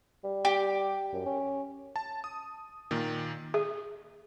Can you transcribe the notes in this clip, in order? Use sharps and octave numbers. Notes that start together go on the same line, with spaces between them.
G3
G4
F#2
C#4
A5
D#6
A#2 D#3
G#4